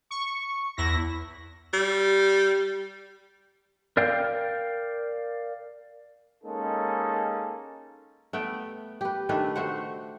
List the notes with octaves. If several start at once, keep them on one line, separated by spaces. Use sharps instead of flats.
C#6
E2 E4 A#6
G3
A#4 D5 F5 G5
G#3 A#3 C#4 D#4 A4
A3 B3 B4 G5
G4 B4
D#3 A3 D4 B4
A3 F#4 C5 F#5